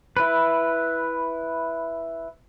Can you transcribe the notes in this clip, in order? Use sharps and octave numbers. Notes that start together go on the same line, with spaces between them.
E4 B4